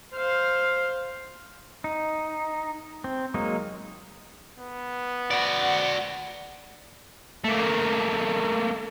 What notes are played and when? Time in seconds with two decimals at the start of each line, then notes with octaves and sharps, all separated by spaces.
0.15 C5 F5
1.84 D#4
3.04 C4
3.34 F#3 G#3 A#3 D#4
4.58 B3
5.31 F#4 D5 F#5
7.44 A3 A#3